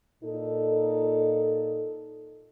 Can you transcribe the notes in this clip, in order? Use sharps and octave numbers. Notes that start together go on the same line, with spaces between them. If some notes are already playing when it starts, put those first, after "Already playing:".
A#2 D#4 A4